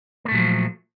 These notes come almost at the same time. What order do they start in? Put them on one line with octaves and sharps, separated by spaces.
A#3 A3 A#2 F#3 F3